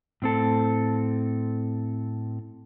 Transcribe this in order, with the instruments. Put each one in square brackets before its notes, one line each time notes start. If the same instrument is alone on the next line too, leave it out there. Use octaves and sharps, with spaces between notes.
[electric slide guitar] A2 C4 A4